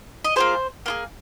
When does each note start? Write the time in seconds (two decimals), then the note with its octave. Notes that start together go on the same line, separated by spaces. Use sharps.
0.24 D#5
0.36 A#3 F4 G#4 C5
0.86 A#3 F4 G#4